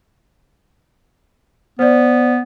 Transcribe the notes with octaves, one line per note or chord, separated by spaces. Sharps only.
B3 C5 D5